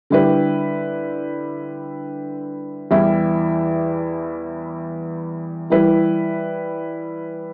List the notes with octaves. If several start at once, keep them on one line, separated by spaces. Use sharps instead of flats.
D3 G3 E4 G4 B4
E2 E3 G3 E4
E3 G3 E4 B4